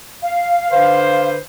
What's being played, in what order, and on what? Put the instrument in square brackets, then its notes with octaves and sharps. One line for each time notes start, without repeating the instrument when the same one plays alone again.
[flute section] F5
[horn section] D3 B4 C5